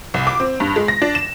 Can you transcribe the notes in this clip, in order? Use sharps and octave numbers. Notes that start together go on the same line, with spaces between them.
C2
D6
C4
G2
G#3
A#6
D4
E7